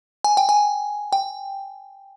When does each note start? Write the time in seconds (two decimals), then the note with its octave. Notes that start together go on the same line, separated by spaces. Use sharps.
0.24 G#5
0.37 G5
0.49 G#5
1.13 G5